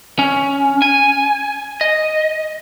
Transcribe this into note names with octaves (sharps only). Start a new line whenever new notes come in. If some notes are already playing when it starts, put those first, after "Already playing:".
C#4
G#5
D#5